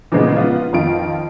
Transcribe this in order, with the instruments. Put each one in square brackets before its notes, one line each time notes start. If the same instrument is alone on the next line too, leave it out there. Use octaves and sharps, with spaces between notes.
[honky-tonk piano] A#2 C#3 E3 F3 G#3 B3
B3 F4
F2 D#3 F4 D7